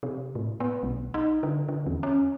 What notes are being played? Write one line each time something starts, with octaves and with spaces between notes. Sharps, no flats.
C3
A2
B3
B1
D#4
D3
D3
E2
C#4